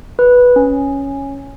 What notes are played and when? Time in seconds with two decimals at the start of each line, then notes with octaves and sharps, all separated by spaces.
0.19 B4
0.56 C#4